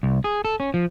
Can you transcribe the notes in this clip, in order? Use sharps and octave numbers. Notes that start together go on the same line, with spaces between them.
C2
G#4
A4
C#4
F3